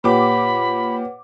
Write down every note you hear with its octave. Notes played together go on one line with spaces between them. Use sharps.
A#2 G4 B4 C#5 F#5 B5 D6